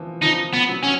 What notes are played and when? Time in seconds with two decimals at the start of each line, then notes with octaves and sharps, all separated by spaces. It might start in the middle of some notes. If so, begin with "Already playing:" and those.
Already playing: E3 F3
0.22 F3 D#4
0.54 B3
0.68 F#3
0.84 C#4